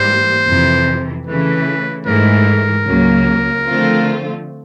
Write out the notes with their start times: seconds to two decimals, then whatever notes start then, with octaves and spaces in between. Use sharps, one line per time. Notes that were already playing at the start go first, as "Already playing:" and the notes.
Already playing: G#2 E3 G3 A#3 C5
0.47 F2 C3 E3
1.27 C#3 E3 A3 B4
2.06 G#2 E3 A3 A#4
2.86 C#2 C#3 F#3 A#3
3.65 D3 F3 A3 C4 F4